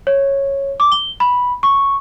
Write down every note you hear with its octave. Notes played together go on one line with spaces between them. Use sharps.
C#5
D6
G7
B5
C#6